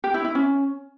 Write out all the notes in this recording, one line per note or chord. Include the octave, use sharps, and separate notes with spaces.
G4
E4
E4
C#4